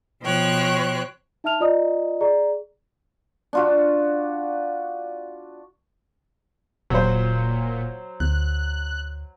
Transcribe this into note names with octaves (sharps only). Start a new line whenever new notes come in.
B2 F3 C5 C#5 G5 F#6
D#4 E5 A5 F6 F7
F4 D5 D#5 A#5 D#6
G#4 D5 A#5
D4 F4 F#4
D#1 A#2 F#3 C5
D2 F#6